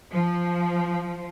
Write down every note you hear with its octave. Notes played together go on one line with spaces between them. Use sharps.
F3